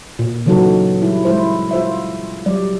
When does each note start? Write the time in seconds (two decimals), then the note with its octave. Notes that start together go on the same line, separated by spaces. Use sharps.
0.19 A#2
0.46 C#3 E3 F#3 D#4 F#4 A4
1.02 G3 E4
1.25 G#3 E4 C5
1.71 F4 C5 E5
2.46 F#3 G3 D5